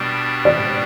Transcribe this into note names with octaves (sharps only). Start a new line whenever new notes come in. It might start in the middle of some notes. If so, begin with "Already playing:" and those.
Already playing: B2 G3 D4
D5